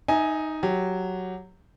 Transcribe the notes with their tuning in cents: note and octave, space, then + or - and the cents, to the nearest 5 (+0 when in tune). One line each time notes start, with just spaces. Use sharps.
D#4 +0 E5 -30 G#5 +0
F#3 +0 G4 +0